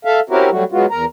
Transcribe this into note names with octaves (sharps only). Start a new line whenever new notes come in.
A4 E5 F5
C4 C#4 E4 F#4 G4 A#4
F#3 G3 A3 F#4
F#3 G#3 B3 F4 F#4
E2 A#4 A#5